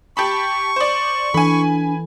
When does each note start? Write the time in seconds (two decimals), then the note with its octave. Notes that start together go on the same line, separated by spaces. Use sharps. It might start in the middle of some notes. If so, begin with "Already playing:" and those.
0.17 G4 A5 B5 C#6
0.76 C5 D5
1.34 E3 D4 A4 G#5 B5